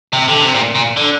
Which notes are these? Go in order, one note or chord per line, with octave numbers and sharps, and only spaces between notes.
C3
D3
C3
A#2
A#2
D3